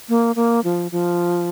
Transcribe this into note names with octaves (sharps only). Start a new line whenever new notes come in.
A#3
A#3
F3
F3